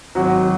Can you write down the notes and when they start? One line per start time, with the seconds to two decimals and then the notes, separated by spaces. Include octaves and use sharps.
0.15 G#1 F#3 F#4
0.42 F#4